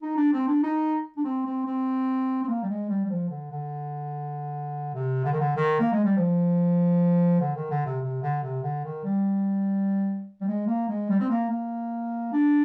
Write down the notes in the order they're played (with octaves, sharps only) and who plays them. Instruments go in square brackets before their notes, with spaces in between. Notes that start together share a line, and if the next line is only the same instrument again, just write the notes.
[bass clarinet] D#4
D4
C4
D4
D#4
D4
C4
C4
C4
C4
A#3
G3
G#3
G3
G3
F3
D3
D3
C3
D3
D#3
D3
D#3
A#3
G#3
G3
F3
D3
D#3
D3
C3
C3
D3
C3
D3
D#3
G3
G3
G#3
A#3
G#3
G3
C4
A#3
A#3
D4